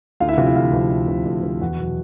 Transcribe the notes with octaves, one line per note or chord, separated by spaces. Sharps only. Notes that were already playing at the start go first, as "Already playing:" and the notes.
D2 F4 F5
E4 E5
C3 F3 F4 F5
E4 E5
D2 F4 F5
C3 F3
D2
C3 F3
D2
C3 F3
E2 F#4 F#5
B2 F#3